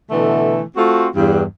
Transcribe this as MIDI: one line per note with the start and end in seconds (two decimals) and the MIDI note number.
0.11 0.63 47
0.11 0.63 50
0.11 0.63 52
0.11 0.63 57
0.77 1.07 57
0.77 1.07 60
0.77 1.07 65
0.77 1.07 66
1.16 1.44 40
1.16 1.44 43